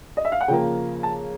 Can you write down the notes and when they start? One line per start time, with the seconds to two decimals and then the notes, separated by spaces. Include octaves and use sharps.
0.17 D#5
0.25 E5
0.32 F5
0.41 F#5
0.48 C#3 F3 A#3 G5
1.03 A5